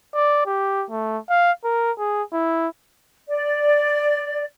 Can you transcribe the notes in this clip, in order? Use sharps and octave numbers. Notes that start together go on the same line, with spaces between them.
D5
G4
A3
F5
A#4
G#4
E4
D5